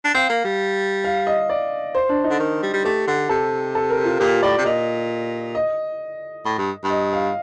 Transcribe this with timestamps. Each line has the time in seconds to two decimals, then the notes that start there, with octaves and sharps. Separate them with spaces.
0.05 D4
0.14 C4 F5
0.29 A#3
0.45 G3
1.04 F5
1.27 D#5
1.50 D5
1.95 C5
2.09 D4
2.24 D#4
2.31 D3
2.39 D#3
2.63 G3
2.73 G3
2.85 A3 G4
3.07 D3
3.29 C3 A4
3.75 A4
3.90 A#4
4.04 F4
4.20 A#2 G4
4.42 A2 D5
4.58 C3
4.65 A#2 D#5
5.55 D#5
6.45 A2
6.58 G2
6.84 G2
6.90 D#5
7.13 F5